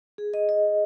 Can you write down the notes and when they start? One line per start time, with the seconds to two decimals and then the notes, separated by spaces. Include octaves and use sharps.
0.18 G#4
0.34 D#5
0.49 D#5